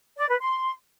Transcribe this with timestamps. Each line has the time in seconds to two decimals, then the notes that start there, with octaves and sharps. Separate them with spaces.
0.17 D5
0.29 B4
0.40 C6